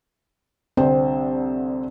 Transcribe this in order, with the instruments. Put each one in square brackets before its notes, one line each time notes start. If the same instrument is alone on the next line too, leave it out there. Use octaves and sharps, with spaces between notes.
[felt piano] C2 D3 C5 [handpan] C4